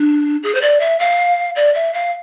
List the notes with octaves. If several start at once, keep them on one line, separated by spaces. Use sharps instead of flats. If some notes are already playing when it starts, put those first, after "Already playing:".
Already playing: D4
G#4
C5
D5
E5
F5
D5
E5
F5